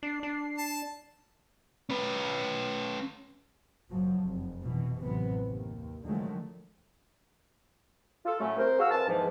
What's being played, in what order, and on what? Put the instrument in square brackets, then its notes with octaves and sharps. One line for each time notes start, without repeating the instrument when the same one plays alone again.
[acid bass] D4 [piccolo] C7
[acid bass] D4
[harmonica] A5
[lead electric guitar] C#4 B4
[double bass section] F#1 F#2 F3 F#3
F1
B2 E3
A1 F#2 C3 E3 B3
D#2
D3 D#3 F3 F#3 G#3 A3
[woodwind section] F4 A4
A2 F#3 A3 C#4
C2 A#4 C5
F#4 G#4 F5 E6
F2 E3 F4 A#4 A5
E2 G#2 E3 F3